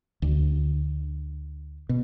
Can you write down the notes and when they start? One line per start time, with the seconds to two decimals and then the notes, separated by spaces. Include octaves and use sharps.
0.22 D2
1.89 B2